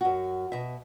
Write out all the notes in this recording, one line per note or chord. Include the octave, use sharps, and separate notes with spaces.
F#2 F#4
B2 E5